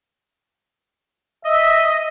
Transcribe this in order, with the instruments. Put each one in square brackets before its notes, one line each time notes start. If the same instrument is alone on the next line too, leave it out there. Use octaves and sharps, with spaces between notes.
[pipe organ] D#5 [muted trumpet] E5